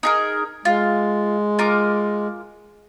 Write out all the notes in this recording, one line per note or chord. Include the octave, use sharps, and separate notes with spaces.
D#4 G#4 A#4
G#3 F4
F4 A#4 D6